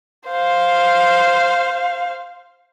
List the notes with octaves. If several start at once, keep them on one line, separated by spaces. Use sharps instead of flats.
C5 F5